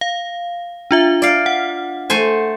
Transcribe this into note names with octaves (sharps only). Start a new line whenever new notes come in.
F5
D4 F4 E5
D5 F5
F#5
A3 C5 G#5